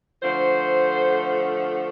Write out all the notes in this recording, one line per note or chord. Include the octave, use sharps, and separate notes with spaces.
D3 F3 A3 C5